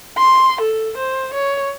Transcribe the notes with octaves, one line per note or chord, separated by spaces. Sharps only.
C6
A4
C5
C#5